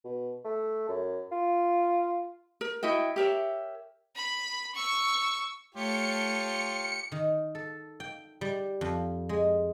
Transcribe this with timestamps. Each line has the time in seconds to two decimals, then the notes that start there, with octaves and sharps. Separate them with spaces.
0.05 B2
0.45 A3
0.89 F#2
1.32 F4
2.61 A#4
2.83 E4 F#4 D#5 G5
3.16 G4 A#4 C#5 E5
4.15 B5
4.75 C#6 E6
5.75 A3 F4 G4 C#5 A5 C#7
7.12 D#3
7.55 A4
8.00 G5
8.41 G3
8.81 F2
9.29 G#3